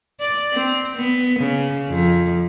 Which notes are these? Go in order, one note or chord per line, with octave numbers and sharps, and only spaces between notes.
D5
C4
B3
C#3
F2